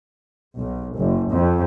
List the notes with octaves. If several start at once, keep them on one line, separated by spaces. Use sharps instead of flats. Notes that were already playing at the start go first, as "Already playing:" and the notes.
B1
F#1
F2